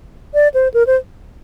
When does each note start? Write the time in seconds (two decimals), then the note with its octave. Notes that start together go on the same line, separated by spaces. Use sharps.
0.34 D5
0.54 C5
0.74 A#4
0.87 C5